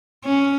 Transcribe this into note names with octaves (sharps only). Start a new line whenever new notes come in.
C#4